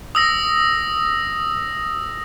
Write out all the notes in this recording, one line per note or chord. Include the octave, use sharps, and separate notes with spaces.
D#6 E6 A#6